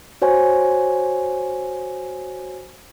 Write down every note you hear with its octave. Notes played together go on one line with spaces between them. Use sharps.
F#4 C5 C#5 G#5